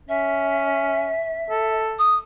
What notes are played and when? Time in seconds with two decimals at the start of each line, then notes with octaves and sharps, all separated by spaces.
0.09 C#4 E5
1.50 A4
1.99 D#6